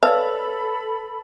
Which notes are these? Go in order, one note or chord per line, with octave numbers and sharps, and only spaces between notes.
A4 B4 C#5 D5 F5 A5 B5 E6